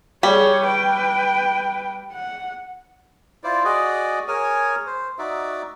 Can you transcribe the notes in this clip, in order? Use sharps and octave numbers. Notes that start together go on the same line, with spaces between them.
G3 G#4 C#5
B4 G5
F#5
E4 F4 C5 D5
F#4 G#4 D5 D#5
G#4 A#4 C#5 G#5
C5
D#4 F#4 D5 E5